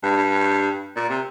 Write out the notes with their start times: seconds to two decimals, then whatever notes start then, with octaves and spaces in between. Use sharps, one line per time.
0.03 G2
0.96 A#2
1.09 C3